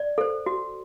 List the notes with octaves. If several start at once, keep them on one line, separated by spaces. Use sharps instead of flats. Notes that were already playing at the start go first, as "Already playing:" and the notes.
Already playing: D5
A4 C5
F#4